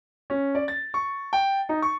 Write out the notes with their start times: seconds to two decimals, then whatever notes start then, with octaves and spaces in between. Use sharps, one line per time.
0.30 C#4
0.55 D5
0.68 A6
0.94 C#6
1.33 G5
1.69 D#4
1.82 C#6